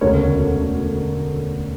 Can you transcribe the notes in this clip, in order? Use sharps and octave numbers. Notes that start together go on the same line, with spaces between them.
E1 D2 C#3 A#4 C#5